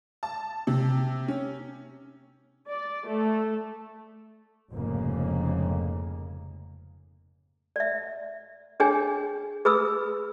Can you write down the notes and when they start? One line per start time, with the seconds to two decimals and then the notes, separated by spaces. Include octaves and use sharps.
0.23 A5
0.67 C3
1.28 C#4
2.68 D5
3.07 A3
4.71 F1 F2 G#2 C#3 A#3
7.76 D5 E5
8.80 D4 G#4 C#5 G5 G#5
9.65 G#4 B4 B5 D#6 E6